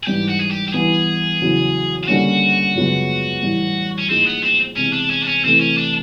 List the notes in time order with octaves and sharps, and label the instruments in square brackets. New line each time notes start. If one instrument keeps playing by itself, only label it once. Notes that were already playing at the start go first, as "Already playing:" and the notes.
[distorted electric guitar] G#4
[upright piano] G#2 E3 G3 [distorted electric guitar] G4
[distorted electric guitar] F#4
G#4
G4
G4
[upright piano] E3 G3 B3 [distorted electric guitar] G#4
[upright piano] E2 C#3 F#3
[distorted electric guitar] F4
[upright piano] D3 G3 A#3 C#4 [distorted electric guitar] F#4
[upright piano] F#2 C#3 F3 G#3 B3
A2 E3 G3
[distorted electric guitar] C#4
[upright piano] A2 F3 A#3 D#4 G#4 [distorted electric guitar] C4
[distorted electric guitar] B3
C4
[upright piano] C3 E3 G#3 B3 [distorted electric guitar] C#4
[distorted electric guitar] D4
C#4
D4
C#4
[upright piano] C3 E3 A3 [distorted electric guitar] C4
[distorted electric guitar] C#4
D4